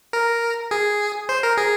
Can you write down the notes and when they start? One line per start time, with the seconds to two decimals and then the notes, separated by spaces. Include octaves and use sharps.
0.13 A#4
0.71 G#4
1.29 C5
1.43 A#4
1.57 G#4